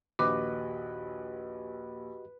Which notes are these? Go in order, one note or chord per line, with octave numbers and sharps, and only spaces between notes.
A#1 D#2 F#4 G4 B4 D#5 D6